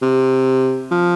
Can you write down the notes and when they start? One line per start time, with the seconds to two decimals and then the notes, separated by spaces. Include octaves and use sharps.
0.02 C3
0.91 F3